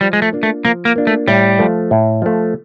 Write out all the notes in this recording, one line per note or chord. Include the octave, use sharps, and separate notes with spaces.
F3 G3
G#3
A3
A#3 D4 F4
A3
F3 A#3
A#3
A#3 D4 F4
A3
A2 G3
F3 A3
A2
F3 A3